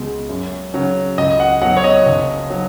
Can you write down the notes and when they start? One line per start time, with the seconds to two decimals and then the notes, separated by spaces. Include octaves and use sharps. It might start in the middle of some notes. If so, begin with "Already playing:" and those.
Already playing: C#2 B2 G#3
0.29 F#2
0.74 C#3 F#3
1.18 C#2 D#5
1.40 F#5
1.62 B2 F#3 F#5
1.77 C#5
1.84 D#5
2.06 F#1
2.50 F#3